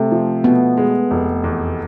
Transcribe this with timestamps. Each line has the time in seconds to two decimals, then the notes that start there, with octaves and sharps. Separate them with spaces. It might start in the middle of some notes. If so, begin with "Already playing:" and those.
Already playing: C3 A3
0.12 F3
0.44 B2 B3
0.77 G#3
1.11 F1
1.44 E2